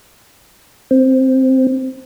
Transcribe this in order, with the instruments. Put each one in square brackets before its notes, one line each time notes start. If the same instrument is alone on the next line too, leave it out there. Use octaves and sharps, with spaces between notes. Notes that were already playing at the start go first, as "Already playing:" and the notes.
[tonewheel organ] C4